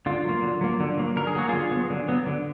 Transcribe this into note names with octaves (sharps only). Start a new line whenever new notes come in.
D3 F4
F#3 A#3
D3
F#3 A#3
D3
F#3 A#3
D3 A#4
G#4
F#3 A#3 F#4
D3 F4 G#4
F#3 B3
D3
F#3 B3
D3